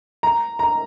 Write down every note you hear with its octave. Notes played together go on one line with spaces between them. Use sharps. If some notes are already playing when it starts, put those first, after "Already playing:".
A#5
A#5